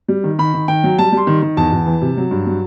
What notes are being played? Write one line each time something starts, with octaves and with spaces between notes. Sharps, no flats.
G3
D#3
D#3 B5
D#3
D#3 G5
F#3
G3 A5
G3 C6
D#3
D#3
E2 A5
E2
E3
C3
F#3
G2
F#3